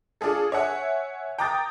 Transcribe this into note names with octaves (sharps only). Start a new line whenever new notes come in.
D4 F4 G#4 A4
C#5 E5 F#5 G#5
G5 A#5 D6 D#6 G6 A6